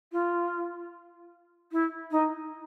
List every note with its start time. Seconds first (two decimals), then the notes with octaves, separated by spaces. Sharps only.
0.12 F4
1.72 E4
2.11 D#4